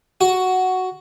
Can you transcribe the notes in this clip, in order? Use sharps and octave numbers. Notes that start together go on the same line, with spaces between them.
F#4